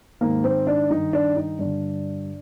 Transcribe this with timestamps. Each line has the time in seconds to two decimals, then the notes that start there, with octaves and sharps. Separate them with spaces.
0.21 G#2 D#3 A#3
0.44 C4
0.67 D4
0.90 G2 D#3 D#4
1.13 D4
1.37 D#4
1.59 G2 D3 D4